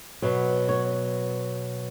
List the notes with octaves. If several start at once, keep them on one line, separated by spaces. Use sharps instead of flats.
B2 F#3 B3
C#5